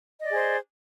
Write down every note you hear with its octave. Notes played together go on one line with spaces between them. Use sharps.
G#4 C5 D5 D#5